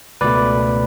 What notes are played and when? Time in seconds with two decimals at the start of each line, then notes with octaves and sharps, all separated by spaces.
0.21 C#2 B2 A3 B4 D5